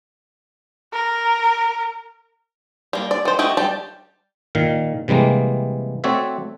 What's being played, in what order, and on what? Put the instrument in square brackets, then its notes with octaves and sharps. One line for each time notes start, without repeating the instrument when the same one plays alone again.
[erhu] A#4
[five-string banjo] G3 A#3
D5
D#3 C5
A3 F#4 G4 D#5
G3 G4 A5
[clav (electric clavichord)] A#2 D#3 F5
C3 E3 G3 G#3 A#3
A3 C4 F#4 C#5 D5 E5